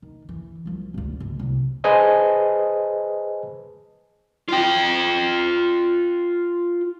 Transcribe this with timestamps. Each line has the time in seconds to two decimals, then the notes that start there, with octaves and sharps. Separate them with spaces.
0.02 D#3
0.29 E3
0.65 C2 F3
0.94 G#1 D2
1.20 C#2
1.39 D1 C2
1.84 G#4 B4 C5 D#5 G#5 A5
4.48 F4 G5